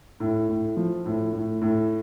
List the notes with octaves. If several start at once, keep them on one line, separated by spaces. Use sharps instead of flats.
A2
A2
F3
A2
A2
A2